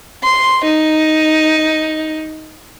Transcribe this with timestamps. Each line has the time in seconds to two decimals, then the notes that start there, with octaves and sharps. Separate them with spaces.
0.23 C6
0.64 D#4